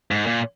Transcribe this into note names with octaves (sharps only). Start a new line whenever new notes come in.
G#2
A#2